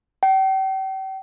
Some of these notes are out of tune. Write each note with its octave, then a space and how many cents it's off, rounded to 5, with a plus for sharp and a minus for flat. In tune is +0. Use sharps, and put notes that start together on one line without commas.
G5 -40